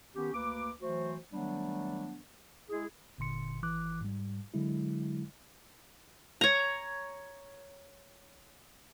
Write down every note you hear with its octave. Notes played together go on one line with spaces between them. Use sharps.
D#3 B3 C#4 G4
D2 A#3 B4 D6
E3 F#3 A3 F#4 C5
D#3 F#3 G3 A3 B3 D4
G#3 E4 G#4
G1 A#2 D3 C6 C#7
G#1 E3 D6 F#6
G#2 G3
D3 F#3 G#3 E4
C#5 A#5